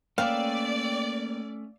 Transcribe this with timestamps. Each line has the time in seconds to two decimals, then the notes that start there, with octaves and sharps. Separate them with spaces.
0.18 A3 A#3 C#4 B4 D5 E5 F5 G5